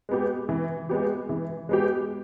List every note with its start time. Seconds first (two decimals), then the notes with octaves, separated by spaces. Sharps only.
0.09 G#3 B3 G4
0.49 E3
0.89 G#3 B3 G4
1.29 E3
1.69 G#3 B3 G4